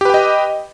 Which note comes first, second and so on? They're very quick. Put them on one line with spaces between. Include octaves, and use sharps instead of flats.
G4 B4 G5 D#5